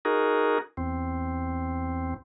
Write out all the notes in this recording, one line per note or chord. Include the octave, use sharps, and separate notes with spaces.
D#4 F#4 G#4 A#4
E2 C4